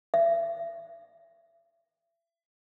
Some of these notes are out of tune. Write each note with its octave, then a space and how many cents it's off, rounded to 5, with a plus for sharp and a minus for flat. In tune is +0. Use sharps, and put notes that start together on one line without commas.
E5 +35